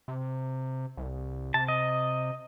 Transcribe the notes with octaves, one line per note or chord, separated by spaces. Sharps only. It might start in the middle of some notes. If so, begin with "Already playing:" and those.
C3
C2
C3 A5
D#5